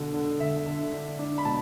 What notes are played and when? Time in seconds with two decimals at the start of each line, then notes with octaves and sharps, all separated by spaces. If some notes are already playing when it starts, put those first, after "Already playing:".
Already playing: B2 D3
0.14 D3
0.40 D3 E5
0.66 D3
0.93 D4
1.19 D4
1.38 B5
1.45 B2 A5